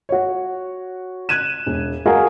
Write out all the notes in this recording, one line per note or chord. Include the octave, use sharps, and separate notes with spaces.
F#4 C#5
F#6 G#6 D#7 E7
E1
F#4 G#4 A#4 F5 G#5